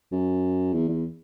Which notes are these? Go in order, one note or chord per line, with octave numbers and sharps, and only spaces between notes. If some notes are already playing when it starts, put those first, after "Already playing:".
F#2
E2
E2